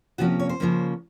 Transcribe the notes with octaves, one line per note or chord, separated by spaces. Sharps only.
C3 F3 A#3 C#4 F#4
C#5
C5
C#3 F3 A#3 C#4